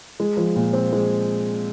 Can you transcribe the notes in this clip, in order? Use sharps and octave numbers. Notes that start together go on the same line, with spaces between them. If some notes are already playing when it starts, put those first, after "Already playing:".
G#3
F3
A#2
C4
G#3